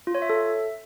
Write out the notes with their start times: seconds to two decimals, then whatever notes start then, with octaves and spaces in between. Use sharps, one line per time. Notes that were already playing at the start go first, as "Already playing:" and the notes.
0.07 F4
0.15 C#5
0.22 E5
0.30 A4
0.37 E5